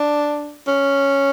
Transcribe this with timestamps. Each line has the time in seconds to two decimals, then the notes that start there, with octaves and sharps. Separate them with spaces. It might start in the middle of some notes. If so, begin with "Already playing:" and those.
Already playing: D4
0.67 C#4